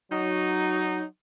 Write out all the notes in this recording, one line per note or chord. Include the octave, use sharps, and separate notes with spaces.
F#3 D#4